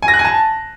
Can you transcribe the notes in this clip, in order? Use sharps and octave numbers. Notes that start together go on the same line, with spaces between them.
G#5
A#6
F#6
G#5
A5